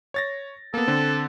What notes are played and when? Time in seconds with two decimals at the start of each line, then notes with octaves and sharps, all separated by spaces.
0.14 C#5 A6 A#6
0.74 A#3 B3 A4
0.88 D3 C4